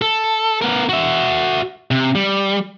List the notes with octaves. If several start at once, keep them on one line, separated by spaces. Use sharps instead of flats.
A4
B3 A#4
F#4 E5
C3
G3